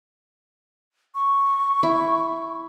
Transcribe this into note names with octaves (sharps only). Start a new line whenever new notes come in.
C#6
E4